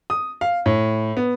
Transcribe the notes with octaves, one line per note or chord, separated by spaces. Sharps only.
D#6
F5
A2
B3